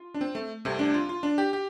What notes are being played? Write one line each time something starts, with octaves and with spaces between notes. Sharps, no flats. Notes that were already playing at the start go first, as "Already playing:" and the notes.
Already playing: F4
D4
C4
A3
C2 C3 A3
D4
F4
F4
D4
G4
G4